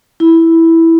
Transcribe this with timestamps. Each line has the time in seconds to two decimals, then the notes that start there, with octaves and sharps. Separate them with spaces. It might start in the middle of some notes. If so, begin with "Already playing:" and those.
0.20 E4